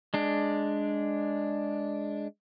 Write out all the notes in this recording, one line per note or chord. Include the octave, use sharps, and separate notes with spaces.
G#3 D4